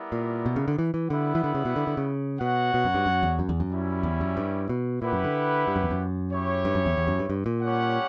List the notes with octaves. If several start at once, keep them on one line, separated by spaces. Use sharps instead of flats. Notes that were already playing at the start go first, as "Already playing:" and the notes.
Already playing: G3 B3 E4 A#4 D5
A#2
B2
C#3
D3
E3
E3
D3 G3 B3 E4 B4 F#5
E3
D3
C#3
B2
D3
D3
C#3
B2 F#4 C#5 F#5
B2
F#2
G2
F#2
E2
F#2
E2
F#2
G3 C#4 E4
E2
F#2
G2
B2
A#2 E4 G4 B4 F#5
F#2
D3
G2
F#2
E2
F#2
E4 G4 C#5
G2
F#2
E2
E2
F#2
G2
G2
A#2
G3 C#4 G4 C#5 F#5